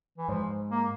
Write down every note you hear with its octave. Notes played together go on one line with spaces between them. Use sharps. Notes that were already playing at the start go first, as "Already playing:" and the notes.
E3
G#2 F3
A#3